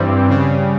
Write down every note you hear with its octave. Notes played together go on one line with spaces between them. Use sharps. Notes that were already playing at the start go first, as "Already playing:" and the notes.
Already playing: G2 E3 G3 C4
C#3